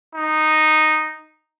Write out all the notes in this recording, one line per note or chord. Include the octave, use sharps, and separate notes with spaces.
D#4